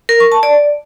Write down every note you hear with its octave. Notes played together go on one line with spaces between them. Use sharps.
A#4
C#6
A5
D5